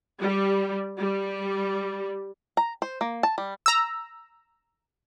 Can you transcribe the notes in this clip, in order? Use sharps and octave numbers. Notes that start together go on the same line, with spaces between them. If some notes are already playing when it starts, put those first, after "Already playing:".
G3
G3
A#5
C5
A#3
A5
G3
A#5 E6